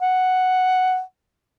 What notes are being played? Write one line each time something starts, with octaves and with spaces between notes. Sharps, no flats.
F#5